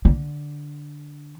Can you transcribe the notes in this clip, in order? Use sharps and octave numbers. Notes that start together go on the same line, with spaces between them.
D3